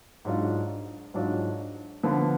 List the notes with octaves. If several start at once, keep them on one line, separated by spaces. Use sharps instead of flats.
G#2 F#3 D4 F4
G#2 F#3 D4 F4
D3 F3 B3